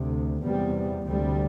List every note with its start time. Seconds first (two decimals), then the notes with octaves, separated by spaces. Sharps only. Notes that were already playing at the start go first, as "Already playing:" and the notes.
Already playing: D2 C3
0.42 E2 C3 G3
1.07 D2 C3 G3